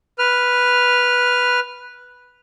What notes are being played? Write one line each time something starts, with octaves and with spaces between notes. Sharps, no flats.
B4 F6